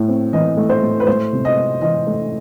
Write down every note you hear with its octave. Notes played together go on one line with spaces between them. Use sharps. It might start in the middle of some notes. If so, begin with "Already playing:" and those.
Already playing: A2 A3
C4
E3 D#5
A3
C5
A2
B4
A3 C5
C3
D#5
C4
E3 D#5
A3